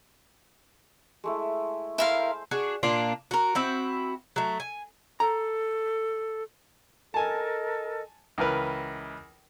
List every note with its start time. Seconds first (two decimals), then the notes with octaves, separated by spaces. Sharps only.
1.24 G#3 A3 E4
1.98 E4 A#4 C5 F5
2.51 D4 F#4 G#4
2.83 A#2 A#3 D4 F4
3.31 F#4 A#4
3.55 C4 E4 F#4
4.36 F#3 A3
4.60 G#5
5.20 A4 A#5
7.14 A4 A#4 D#5 G#5 A5
8.38 C#2 E3 A#4 B4